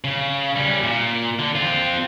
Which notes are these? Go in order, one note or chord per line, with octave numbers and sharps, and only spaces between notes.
C#3
G3 C#4
A#2
D3
C4 F4